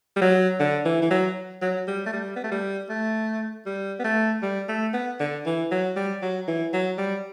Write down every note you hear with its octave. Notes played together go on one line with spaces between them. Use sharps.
G3
F#3
D3
E3
E3
F#3
F#3
G3
A3
G3
B3
A3
G3
A3
G3
B3
A3
G3
A3
B3
D3
E3
F#3
G3
F#3
E3
F#3
G3